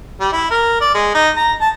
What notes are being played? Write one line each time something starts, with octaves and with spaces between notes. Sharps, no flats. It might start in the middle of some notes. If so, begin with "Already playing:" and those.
G3
E4
A#4
D5
G#3
D#4
A#5
A5